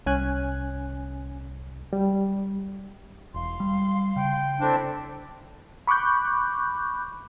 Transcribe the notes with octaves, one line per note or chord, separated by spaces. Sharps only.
C2 C#4 G#5 F#6
G3
E1 F5 C6
G3
C#3 G5
C4 D4 E4 A4
B5 C#6 D6 F#6 G6